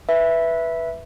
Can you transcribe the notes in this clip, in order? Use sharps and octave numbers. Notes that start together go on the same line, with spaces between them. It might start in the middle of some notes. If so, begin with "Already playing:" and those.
B4 E5